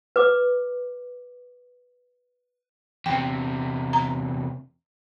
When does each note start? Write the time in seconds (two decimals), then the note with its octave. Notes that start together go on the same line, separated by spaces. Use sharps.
0.16 B4 D6
3.06 E2 C3 G5
3.93 A#5